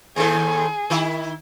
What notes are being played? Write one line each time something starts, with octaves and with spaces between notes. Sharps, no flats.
D#2 A2 G#4 A4
D#3 E4